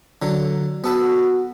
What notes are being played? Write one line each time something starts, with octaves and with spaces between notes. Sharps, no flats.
D3 F#3
B3 F#4 A4 B4